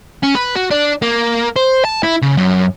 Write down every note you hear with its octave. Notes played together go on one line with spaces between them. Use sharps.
C#4
B4
F#4
D4
A#3
C5
A5
E4
C#3
F#2